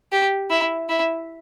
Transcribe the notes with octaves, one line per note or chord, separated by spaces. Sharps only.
G4
E4
E4